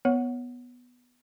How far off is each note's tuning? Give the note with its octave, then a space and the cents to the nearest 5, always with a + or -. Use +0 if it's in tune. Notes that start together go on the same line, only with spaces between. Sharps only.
B3 +0 C#5 +0 F#5 +0